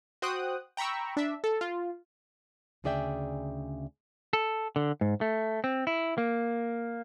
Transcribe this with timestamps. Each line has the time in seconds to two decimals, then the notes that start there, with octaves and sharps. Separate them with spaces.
0.22 F#4 C5 G5 D#6 F#6
0.77 G5 A#5 B5 C#6 E6
1.17 D4 E5
1.44 A4
1.61 F4
2.84 D2 C#3 G#4 D5 E5 G5
4.33 A4
4.76 D3
5.01 G#2
5.21 A3
5.64 C4
5.87 E4
6.18 A#3